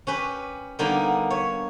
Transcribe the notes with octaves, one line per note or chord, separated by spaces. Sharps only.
C#4 G4 B4
D3 G3 A#3 B3 D#4
C#5 E5